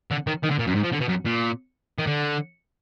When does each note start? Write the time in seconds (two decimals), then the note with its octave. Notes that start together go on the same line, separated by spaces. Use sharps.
0.11 D3
0.27 D#3
0.44 D#3
0.51 D3
0.60 A#2
0.68 F#2
0.76 G#2
0.84 F3
0.93 D3
1.01 B2
1.09 F#2
1.26 A#2
1.99 D#3
2.07 D3